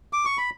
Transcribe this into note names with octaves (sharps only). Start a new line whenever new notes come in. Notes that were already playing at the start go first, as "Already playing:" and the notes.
D6
C#6
B5